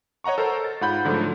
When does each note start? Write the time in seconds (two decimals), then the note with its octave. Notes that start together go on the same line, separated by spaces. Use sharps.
0.24 C#5 D#5 F#5 A#5 C#6
0.38 A4 A#4 C5 A#5
0.64 A6
0.81 G#2 F4 F#5 B5 G6
1.05 G#2 D3 F3 F#3 A3